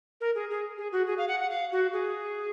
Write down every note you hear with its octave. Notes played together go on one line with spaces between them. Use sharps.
A#4
G#4
G#4
G#4
F#4
G#4
F5
F#5
F#5
F5
F#4
G#4